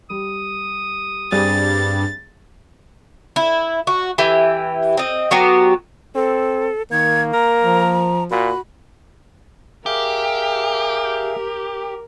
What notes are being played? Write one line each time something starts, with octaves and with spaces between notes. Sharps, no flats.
G3 D#6
G2 G3 C4 G#4 A6
E4
F#4
E3 E4 G4 G5
C4 D#5
F#3 B3 F#4 G4
C4 A4
D#3 A#3 G#6
A#4 A#5
F3
A#2 F#4 B5
G4 G#4 A#4 E5 F5